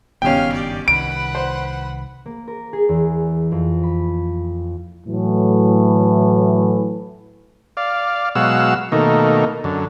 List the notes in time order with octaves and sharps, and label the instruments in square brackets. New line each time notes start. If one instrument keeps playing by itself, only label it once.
[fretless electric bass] F#1 G2 D#3 [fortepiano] B2 C#4 [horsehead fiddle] G4 F5 [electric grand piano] G5
[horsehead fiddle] G4 D5
[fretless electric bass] C2 D#3 [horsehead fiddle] B4 F#5 [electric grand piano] D7
[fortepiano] C5
[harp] A#3
A#4
G#4
E2
F2
B5
[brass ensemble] A2 E3 F#3
[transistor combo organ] D5 F5
B2 F#3 G#3 F5 F#5 E6
B2 D#3 A3 A#3 D#4
F#2 D3